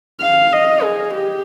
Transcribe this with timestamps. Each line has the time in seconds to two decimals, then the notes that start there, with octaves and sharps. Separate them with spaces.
0.21 F5
0.52 D#5
0.83 G#4
1.14 G4